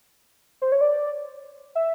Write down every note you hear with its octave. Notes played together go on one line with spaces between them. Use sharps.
C5
C#5
D5
E5